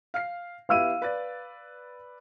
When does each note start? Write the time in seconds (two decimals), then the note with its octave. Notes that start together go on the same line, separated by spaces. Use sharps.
0.14 F5 F6 C7
0.69 B3 E4 G4 F5 E6 D#7
1.02 B4 D5 A6